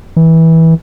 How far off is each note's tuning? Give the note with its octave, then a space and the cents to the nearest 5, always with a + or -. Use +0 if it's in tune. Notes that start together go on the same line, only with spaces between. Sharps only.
E3 -20